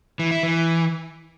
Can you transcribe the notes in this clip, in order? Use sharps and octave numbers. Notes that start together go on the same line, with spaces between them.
E3
E4
E3